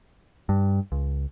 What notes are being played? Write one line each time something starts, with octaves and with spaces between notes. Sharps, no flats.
G2
C#2